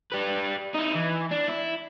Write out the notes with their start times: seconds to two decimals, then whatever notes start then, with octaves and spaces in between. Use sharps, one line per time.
0.12 G3 B4
0.75 D#4 E4
0.95 E3
1.31 D4
1.48 E4